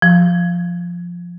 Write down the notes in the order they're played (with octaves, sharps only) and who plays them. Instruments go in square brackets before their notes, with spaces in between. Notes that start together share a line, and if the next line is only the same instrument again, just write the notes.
[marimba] F3